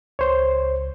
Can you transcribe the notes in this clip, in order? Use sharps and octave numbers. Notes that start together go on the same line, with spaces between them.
C#2 C5 C#5